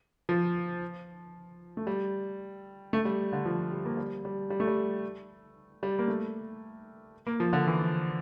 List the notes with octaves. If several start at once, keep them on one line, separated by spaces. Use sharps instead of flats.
F3
A3
G3
A3
G3
D3
F3
G3
A#3
G3
G3
G3
A3
G3
G3
A#3
A3
A#3
F3
D3
E3